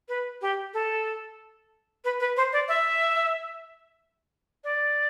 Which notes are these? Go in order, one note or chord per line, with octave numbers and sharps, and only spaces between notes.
B4
G4
A4
B4
B4
C5
D5
E5
D5